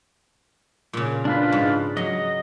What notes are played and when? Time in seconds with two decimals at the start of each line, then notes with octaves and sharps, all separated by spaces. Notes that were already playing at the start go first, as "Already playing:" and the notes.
0.93 A#2 C#3
1.25 D4 F4 B4
1.52 G#2
1.97 F#3 D#5